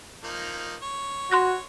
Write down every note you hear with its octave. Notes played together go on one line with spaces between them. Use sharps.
F3 A#3 D#4
C#5
F#4 C6 F#6 A#6